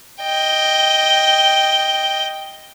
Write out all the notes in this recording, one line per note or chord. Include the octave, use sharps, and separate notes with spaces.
D#5 G5